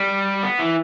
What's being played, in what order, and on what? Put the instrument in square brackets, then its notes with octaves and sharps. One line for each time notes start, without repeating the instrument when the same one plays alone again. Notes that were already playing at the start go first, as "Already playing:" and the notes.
Already playing: [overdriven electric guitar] G3
B3
E3